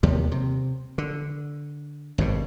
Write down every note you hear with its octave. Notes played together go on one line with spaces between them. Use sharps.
D#2 C3 G3
C3
D3
G#1 G2 B2